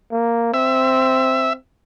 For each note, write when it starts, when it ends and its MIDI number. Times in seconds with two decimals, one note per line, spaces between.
0.12 0.52 58
0.54 1.57 60
0.54 1.53 76